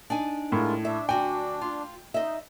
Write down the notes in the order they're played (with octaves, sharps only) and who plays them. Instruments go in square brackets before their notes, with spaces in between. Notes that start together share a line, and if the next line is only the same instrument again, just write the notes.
[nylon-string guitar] D4 D#4 G#5
[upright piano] A2 [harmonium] G#3 F4 A#4
[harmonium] D4 [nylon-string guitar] E5
[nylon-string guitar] D2 F#4 G#5 [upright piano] G5
[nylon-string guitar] F4
[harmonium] D#4 [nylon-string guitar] C5 D#5 E5